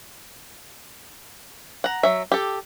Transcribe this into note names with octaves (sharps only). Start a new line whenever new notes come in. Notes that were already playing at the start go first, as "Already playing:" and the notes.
F#5 A#5
F#3 E5
G4 A4